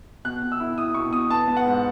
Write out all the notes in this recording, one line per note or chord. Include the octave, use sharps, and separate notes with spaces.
B2 F#6
B2
E6
E4
E4 D#6
B2 C#6
B2 D#6
B3 A5
B3
F#5
G#2